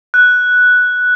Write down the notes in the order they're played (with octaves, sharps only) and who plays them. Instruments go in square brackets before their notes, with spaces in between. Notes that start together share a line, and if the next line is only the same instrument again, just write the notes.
[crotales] F#6